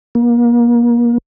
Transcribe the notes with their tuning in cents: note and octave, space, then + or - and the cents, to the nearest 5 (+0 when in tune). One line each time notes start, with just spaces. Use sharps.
A#3 +35